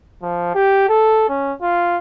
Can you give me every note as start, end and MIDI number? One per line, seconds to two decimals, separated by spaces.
0.23 0.53 53
0.55 0.86 67
0.89 1.29 69
1.29 1.53 61
1.62 1.98 65